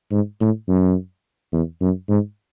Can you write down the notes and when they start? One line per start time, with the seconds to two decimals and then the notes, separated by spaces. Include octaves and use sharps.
0.12 G#2
0.40 A2
0.68 F#2
1.53 E2
1.81 F#2
2.09 G#2